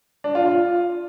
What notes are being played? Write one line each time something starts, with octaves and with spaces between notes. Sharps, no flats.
D4
F4
F4